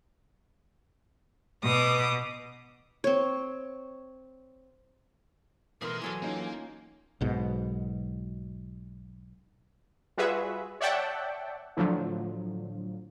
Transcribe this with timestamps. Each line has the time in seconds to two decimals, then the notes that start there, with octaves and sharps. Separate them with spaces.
1.64 B2 D6 D#6
3.04 C4 C#5
5.82 B2 E3 A3 G#4 A#4 C6
6.02 E3 F#3 A4 G#5
6.22 A#3 C#4 D#4 F4
7.21 B1 G#2 B2
10.17 G3 F4 F#4 G#4 B4 E5
10.81 C#5 D5 E5 F#5 G5 A5
11.77 A2 D3 F3 F#3